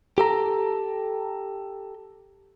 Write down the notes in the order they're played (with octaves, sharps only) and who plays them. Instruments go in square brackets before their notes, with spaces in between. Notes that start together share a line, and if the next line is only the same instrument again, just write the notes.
[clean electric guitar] G4 A4 A#5